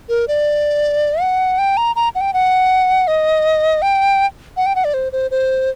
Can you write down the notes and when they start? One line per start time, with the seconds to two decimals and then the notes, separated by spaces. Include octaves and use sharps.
0.09 A#4
0.28 D5
1.21 F#5
1.58 G5
1.77 A#5
1.96 A#5
2.15 F#5
2.21 G5
2.33 F#5
3.08 D#5
3.82 G5
4.57 F#5
4.66 G5
4.75 F#5
4.85 D5
4.94 C5
5.12 C5
5.31 C5